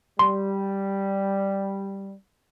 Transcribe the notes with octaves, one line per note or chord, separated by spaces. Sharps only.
G3 C6